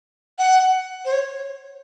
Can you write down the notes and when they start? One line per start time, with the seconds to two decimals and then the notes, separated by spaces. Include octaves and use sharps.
0.39 F#5
1.05 C5
1.12 C#5